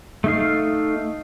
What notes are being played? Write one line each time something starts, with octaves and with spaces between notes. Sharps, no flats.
A3 D#4 F5